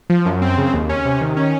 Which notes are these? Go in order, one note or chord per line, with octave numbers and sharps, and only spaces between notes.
F3
F#2
C4
C#3
D#2
C#4
C3
D#3
C#4